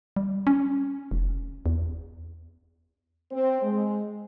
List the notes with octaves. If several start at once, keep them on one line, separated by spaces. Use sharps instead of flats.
G3
C#4
F1
E2
C4
G#3